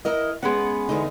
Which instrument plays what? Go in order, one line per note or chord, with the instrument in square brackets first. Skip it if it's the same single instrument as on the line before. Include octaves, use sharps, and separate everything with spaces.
[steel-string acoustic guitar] E4 A#4 D#5
[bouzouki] G#3 B3 F#5 [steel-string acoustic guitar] C#4
[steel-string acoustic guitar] E2 D3 D#4